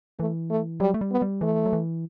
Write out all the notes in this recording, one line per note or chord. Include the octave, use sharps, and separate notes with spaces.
E3 A3
A3
F#3 G3
A3
G3
B3
G3
E3 A3
F#3
E3